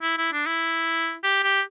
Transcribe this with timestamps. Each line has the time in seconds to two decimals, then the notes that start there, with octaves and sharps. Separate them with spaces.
0.02 E4
0.18 E4
0.33 D4
0.47 E4
1.23 G4
1.43 G4